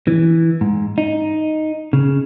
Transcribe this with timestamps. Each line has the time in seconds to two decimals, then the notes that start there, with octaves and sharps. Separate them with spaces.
0.07 E3
0.61 G#2
0.98 D#4
1.93 C#3